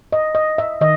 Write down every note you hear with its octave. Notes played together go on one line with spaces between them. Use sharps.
D#5
D#5
E5
D#3 D#5